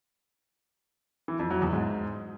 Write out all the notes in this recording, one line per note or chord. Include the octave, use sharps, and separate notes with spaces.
E3
F2
F#3
E2
G#2